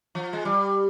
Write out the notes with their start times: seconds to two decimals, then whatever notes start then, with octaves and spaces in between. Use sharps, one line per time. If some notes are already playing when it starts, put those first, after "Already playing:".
0.15 F3
0.33 G#3
0.45 G3